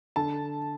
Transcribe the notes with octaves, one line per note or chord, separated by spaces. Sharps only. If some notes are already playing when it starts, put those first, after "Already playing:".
D3 A5